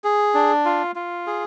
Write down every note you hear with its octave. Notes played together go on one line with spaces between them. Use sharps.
G#4
D4
F4
F4
G#4